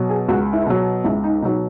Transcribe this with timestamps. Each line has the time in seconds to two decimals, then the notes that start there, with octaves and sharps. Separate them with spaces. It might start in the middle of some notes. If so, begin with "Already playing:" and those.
Already playing: B2 F#3
0.09 G#4
0.29 C#2 F#4
0.53 E4
0.66 B2 F#3
1.04 C#2 E4
1.24 D#4
1.42 B2 D#4
1.45 F#3